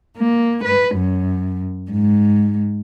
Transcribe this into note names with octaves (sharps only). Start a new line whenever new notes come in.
A#3
B4
F#2
G#2